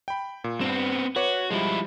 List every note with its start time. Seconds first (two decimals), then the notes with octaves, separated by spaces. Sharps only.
0.08 G5 B5
0.44 A#2
0.61 G2 B3 C4 E7
1.16 F#4 B4 C#5 D6
1.51 F3 G3 G#3 E4